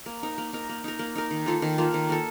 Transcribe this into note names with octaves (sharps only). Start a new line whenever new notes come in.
A#3
D#4 A#4
A#3
D#4 A#4
A#3
D#4 A#4
A#3
D#4 A#4
D#3
A#3 F4 A4
D#3
A#3 F4 A4
D#3
A#3 F4 A4